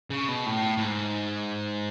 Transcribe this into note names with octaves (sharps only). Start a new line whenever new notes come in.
C#3
B2
A2
A2
G#2